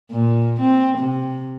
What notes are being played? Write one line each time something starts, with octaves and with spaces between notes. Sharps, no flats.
A#2
C4
C3